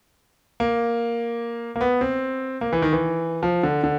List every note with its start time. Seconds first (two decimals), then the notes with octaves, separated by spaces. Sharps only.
0.60 A#3
1.76 A#3
1.81 B3
2.01 C4
2.61 A#3
2.73 E3
2.82 D#3
2.93 E3
3.43 F3
3.63 D3
3.84 D3